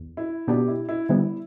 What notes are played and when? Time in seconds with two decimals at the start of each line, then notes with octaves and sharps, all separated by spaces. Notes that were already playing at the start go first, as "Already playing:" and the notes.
Already playing: E2
0.17 E4
0.47 B2 B3 D4 G4
0.68 E4
0.89 E4
1.09 D3 G3 B3 E4